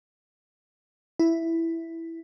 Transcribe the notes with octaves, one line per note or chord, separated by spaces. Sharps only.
E4